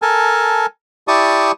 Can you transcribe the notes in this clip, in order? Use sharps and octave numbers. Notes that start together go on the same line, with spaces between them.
A4 A#4 G#5 A5
E4 G4 D5 A5 C#6 D#6